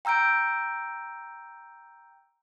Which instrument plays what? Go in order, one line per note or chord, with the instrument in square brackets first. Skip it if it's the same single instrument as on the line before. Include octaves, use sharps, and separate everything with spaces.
[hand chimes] G5 A#5 E6 G6 D7